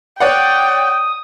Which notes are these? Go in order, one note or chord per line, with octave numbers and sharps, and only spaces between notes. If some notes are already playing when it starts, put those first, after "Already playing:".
C#5 D5 F#5 G5 D#6